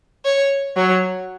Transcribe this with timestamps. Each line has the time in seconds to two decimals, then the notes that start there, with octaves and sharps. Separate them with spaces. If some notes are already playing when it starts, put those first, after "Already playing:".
0.25 C#5
0.77 F#3 C#5